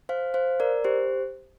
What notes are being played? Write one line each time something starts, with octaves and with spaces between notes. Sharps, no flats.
C5 F5
C5 F5
A#4 D5
G4 C5